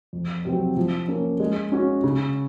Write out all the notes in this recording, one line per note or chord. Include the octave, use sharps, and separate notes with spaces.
F2
C3 F#3 C4
F3
A#3 C#4
G#3
C#4 F#4
C#3